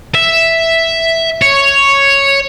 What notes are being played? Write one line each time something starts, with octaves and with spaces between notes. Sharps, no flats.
E5
C#5